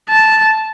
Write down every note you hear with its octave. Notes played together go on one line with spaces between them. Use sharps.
A5